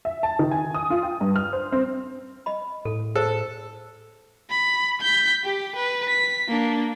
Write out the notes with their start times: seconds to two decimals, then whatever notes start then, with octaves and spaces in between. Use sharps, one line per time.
0.05 E5
0.23 A5
0.39 D#3
0.51 G#5
0.74 D#6
0.90 F4
1.03 G5
1.21 G2
1.36 F6
1.53 C5
1.72 C4
2.46 D#5 B5
2.85 A2 A4
3.15 A4 C5
4.50 B5
5.01 G6 B6
5.44 G4
5.75 B4
6.08 B6
6.48 A#3 D4